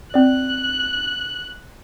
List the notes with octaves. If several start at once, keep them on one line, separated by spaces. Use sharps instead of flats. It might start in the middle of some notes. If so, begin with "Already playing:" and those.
C4 D5 F#6